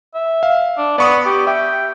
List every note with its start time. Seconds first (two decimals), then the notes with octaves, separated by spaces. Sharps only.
0.15 E5
0.43 F5
0.78 D4
0.98 B3 D5 C#6 D#6
1.25 G4
1.47 E5 G5